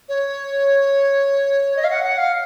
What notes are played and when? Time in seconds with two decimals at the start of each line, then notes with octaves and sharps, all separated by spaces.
0.09 C#5
1.76 D#5
1.84 F5
1.90 F#5
2.04 F#5
2.18 F5